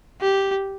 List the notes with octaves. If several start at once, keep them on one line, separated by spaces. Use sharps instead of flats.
G4